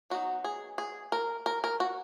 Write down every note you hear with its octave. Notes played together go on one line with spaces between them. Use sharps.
F#3 B3 D#4 F#4
G#4
G#4
A#4
A#4
A#4
F#4